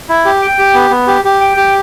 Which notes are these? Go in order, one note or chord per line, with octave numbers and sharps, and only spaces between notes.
E4
G4
G5
G4
B3
B3
G4
G4
G5
G4